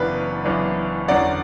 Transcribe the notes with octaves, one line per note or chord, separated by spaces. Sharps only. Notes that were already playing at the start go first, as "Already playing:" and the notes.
Already playing: F#1 F#2 E3 B3 D4 B4
F#1 F#2 E3 B3 D4
E2 D3 F#3 C#4 D5 F#5